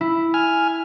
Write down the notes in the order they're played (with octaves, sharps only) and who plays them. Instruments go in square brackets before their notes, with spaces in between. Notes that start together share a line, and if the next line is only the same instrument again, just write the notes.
[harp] E4
[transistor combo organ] G#5 F6